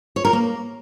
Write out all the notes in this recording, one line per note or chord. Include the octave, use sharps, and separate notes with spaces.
C#5
A#4
A#3